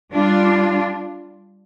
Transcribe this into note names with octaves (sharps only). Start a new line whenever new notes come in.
G3 D4 F4